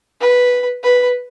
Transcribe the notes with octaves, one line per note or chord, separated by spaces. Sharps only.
B4
B4